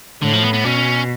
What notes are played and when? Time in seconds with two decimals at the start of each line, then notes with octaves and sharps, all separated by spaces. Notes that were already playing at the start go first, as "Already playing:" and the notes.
0.22 A2 D3
0.33 F3
0.43 B3
0.53 B3
0.64 B2 C#4